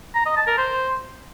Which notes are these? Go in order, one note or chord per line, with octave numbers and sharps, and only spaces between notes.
A#5
D#5
A5
A#4
C5